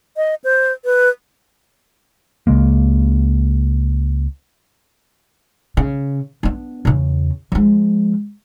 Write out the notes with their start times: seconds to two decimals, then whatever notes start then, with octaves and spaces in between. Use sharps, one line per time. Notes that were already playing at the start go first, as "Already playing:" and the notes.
0.17 D#5
0.44 C5
0.85 B4
2.47 C#2 C#3 G#3 A#3
5.77 C#3
6.43 B3 D4
6.85 E2 C#3
7.52 F3 G#3